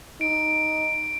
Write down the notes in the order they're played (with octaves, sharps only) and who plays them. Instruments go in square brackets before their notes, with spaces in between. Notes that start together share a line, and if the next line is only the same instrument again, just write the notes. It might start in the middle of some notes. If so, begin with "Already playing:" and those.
[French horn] D#4 [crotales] D7